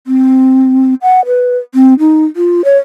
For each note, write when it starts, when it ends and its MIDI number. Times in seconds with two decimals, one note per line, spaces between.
0.07 0.94 60
1.02 1.25 78
1.26 1.58 71
1.75 1.94 60
1.99 2.25 63
2.36 2.64 65
2.65 2.77 73